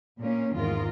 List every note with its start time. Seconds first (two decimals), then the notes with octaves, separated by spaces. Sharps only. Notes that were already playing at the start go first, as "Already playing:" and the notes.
0.18 A#2 A#3 C#4
0.54 E2 G#2 D#3 F4 A#4